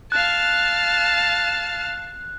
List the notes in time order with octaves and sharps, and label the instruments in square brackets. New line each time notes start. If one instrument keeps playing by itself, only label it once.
[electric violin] F5 A5 [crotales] F#6